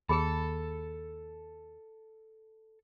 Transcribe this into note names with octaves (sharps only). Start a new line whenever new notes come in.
D#2 G#4 A4 A5 B5